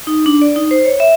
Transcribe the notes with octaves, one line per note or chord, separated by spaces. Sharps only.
D#4
D4
D5
D#4
C5
C#5
E5